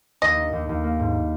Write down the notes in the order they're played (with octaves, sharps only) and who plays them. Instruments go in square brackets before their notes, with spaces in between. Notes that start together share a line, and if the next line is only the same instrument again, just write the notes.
[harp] D#2 [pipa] D#5
[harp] D#4
D#2
D#2
A#3
G#2